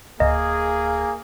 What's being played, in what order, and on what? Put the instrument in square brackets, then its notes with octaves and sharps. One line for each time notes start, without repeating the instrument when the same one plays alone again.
[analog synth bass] D1 [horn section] A#3 G#4 [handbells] D#5